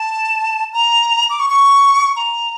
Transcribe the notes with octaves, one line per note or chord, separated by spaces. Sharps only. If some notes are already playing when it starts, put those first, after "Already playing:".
Already playing: A5
A#5
D6
C#6
C#6
A#5